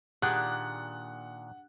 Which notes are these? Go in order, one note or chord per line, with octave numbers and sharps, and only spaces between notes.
A#2 D#3 D4 G4 G#4 F#5 F#6